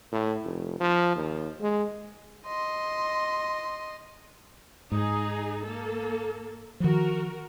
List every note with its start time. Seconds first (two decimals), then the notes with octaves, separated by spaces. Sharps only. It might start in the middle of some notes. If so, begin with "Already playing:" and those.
0.12 A2
0.44 F1
0.80 F3
1.15 D#2
1.61 G#3
2.47 D#5 C6
4.92 G#2 D#4 G#4
5.64 A#3 A4
6.80 D#3 F3 F#4 A#4